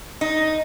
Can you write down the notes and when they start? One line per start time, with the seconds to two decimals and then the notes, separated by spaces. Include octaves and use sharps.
0.21 D#4